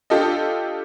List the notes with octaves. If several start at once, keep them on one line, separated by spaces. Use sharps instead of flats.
D4 F4 G4 A4 D#5